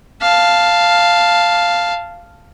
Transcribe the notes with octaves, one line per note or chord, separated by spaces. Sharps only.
F5 A5